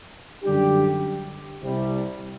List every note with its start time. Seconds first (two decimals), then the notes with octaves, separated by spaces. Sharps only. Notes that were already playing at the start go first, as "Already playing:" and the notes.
0.44 F#2 D3 G3 D4 G4
1.62 C2 C3 G3